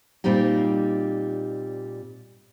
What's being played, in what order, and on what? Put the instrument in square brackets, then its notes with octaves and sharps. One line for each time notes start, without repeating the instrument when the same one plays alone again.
[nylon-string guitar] A#2 G3 C4 D#4 G4